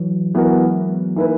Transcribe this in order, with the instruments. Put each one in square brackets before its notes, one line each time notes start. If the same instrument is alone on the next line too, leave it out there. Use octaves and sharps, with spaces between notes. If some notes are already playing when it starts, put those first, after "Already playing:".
Already playing: [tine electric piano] E3 F#3
[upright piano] E3 B3 F#4 A#4 [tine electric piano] F#3
[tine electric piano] G#3
B3
[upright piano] E3 A#3 E4 B4 [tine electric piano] D#4